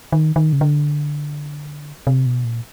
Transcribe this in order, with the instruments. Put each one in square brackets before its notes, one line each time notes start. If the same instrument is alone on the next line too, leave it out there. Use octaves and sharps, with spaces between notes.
[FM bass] D#3
D#3
C#3
D3
C3
B2
A#2